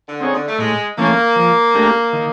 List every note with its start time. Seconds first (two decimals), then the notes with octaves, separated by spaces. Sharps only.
0.08 D3
0.20 C4 D#4 G#4 C#5
0.34 D3
0.48 A3
0.59 A2 G#3
0.98 E3 A3 A#3 C#4
1.36 F3
1.75 A3 D4 G4 A#4
2.13 D#3